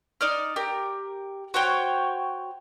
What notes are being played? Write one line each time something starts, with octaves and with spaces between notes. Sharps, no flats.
D#4 D5 F6
G4 A#4
F#4 C5 C#5 G5